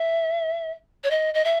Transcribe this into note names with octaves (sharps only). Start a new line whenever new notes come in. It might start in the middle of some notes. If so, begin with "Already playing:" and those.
Already playing: E5
C#5
D#5
D#5
E5